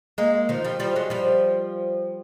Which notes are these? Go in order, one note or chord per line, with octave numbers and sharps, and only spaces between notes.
G#3 A#3
D#3 F3
F3 G3
F3 G3
F#3 G#3
F3 G3